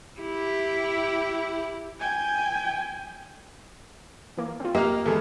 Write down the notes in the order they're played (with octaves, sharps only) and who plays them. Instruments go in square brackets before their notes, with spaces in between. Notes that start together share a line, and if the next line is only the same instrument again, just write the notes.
[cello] E4 G4
[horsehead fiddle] G5 G#5
[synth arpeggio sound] E3 A#3
C4 F4
[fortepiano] A#3 [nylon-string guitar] G4 [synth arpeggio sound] D#5 F6
[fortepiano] E2 G#3 [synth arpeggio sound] A4